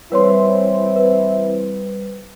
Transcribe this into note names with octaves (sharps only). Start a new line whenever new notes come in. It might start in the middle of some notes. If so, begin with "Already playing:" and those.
E3 G3 C4 E4 B4 C#5 C6
B4